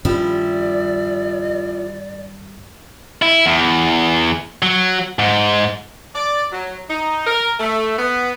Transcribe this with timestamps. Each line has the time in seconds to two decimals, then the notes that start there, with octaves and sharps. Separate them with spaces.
0.05 G2 D#3 F3 G3 C#4 E4 D5
3.22 E4
3.46 E2
4.62 F#3
5.19 G#2
6.15 D5
6.52 F#3
6.89 D#4
7.26 A#4
7.60 A3
7.97 B3